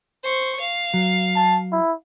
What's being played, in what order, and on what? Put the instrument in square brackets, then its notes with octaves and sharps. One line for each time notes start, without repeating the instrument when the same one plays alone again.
[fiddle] C5 C#6
F5
[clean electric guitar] F#3
[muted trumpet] A5
E4